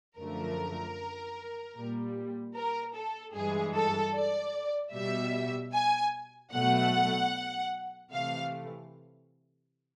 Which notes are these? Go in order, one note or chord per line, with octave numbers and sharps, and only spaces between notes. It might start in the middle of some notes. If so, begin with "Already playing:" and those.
F#2 D3 F3 A3 A#4
A#2 G3
A#4
A4
G2 E3 G#3 G#4
A4
D5
B2 G3 E5
G#5
B2 F#3 A3 F#5
C3 E3 A3 F5